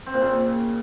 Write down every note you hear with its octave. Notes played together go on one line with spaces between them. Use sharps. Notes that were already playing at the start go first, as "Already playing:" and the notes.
C4
A#2
C#3